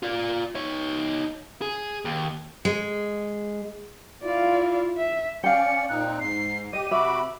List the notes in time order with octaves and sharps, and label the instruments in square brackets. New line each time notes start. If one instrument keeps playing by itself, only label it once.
[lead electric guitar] F4 D5
D#4 C#5
G#4
D#2
[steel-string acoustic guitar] G#3
[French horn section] E4 F4 [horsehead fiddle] D5 F5
[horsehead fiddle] E5
[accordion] C#4 D5 [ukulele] F5 G5 [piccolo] C#7
[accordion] A#2 C4 D#4 [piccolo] F#6
[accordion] G#2 [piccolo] C7
[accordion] G4 [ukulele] D#5 [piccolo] D#7
[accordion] C3 F#4 B5 [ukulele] E5 [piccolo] D6